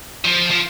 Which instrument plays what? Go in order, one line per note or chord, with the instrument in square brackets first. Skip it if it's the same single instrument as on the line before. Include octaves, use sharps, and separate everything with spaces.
[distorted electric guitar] F3
F3